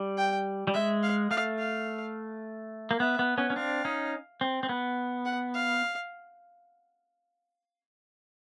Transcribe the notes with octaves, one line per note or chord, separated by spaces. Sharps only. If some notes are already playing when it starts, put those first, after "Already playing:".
Already playing: G3
G5
G3
G#3 E5
F5
A3 F5
F5
A#3
B3 E5
B3
B3 C#4
C#4
C4 D4 F5
C#4 D#4
C4
C4
B3
F#5
F5